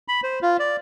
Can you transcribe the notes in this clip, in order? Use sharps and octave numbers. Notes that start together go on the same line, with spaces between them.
B5
C5
F4
D5